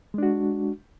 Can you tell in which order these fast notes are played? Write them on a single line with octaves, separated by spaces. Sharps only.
G#3 D4 F#4